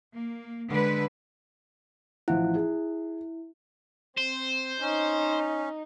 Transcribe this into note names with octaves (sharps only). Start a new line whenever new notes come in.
A#3
D3 G#3 B4
A1 F3 E4 F#5
G#4
C4 C5
C#4 D#4